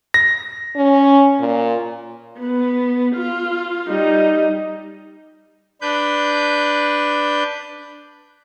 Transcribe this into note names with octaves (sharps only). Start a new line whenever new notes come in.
A#6
C#4
A#2
B3
F4
G3 D#4
D4 B4 G6